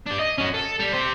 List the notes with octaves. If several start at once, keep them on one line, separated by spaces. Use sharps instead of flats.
D4 G4
D#5
C#4 F#4
A4
G3
G4 C5